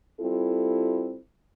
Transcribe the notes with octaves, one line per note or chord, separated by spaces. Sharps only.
G3 C4 E4 F4 A4